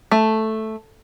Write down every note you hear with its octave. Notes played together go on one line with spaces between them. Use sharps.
A3